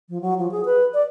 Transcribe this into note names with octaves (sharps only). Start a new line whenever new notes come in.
F3
F#3
F3
G#4
B4
D5